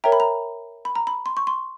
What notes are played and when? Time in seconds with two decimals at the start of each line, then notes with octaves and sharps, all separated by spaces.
0.04 A#4 C#5 E5 G5 A#5
0.12 B5
0.20 A#5
0.85 B5
0.95 A#5
1.07 B5
1.26 C6
1.37 C#6
1.47 C6